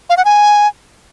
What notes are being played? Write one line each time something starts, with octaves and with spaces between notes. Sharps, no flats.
F5
F#5
G#5